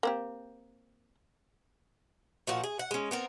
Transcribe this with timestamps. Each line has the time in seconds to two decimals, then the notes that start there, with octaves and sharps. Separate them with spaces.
0.03 A#3 C4 G4
2.47 A#2 F3 F#4
2.63 G#4
2.79 F#5
2.91 G#3 C#4
3.11 B3 C4 A#4